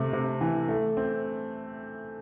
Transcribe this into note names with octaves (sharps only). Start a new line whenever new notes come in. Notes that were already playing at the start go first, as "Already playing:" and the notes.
Already playing: C3 A3
C3
E3
A3
C4